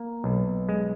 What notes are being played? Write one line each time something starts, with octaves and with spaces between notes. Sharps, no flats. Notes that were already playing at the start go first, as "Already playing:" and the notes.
Already playing: A#3
B1
G#3